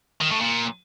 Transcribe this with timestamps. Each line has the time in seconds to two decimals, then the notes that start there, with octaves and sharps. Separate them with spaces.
0.21 D#3
0.31 A2
0.40 A#2